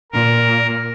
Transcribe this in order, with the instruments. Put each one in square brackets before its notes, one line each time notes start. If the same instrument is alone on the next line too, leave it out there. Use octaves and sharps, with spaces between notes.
[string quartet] A#2 [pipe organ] A#4